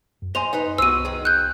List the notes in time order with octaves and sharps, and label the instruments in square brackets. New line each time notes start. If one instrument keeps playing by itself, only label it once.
[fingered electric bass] F#2
[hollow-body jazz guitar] C5 D#5 C6 [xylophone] G#5 F7
[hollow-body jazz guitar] D#4 B4 D#5
[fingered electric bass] C2 B3 [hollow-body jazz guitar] F#4 C5 [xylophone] E6 D#7
[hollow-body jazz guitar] D#3 G#4
[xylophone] F#6 G6